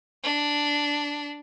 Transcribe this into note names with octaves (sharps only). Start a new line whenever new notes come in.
D4